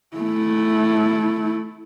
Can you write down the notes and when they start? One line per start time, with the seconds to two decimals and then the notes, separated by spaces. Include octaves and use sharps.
0.17 A3 E4